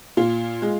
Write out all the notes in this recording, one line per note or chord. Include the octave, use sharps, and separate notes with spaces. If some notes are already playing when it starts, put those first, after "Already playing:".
A#2 F4
G#3